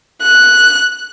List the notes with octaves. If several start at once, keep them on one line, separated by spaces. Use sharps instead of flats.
F#6